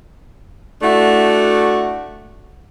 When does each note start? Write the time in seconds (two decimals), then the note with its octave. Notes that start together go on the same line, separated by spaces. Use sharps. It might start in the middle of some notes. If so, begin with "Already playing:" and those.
0.82 A3 D4 E4 F#4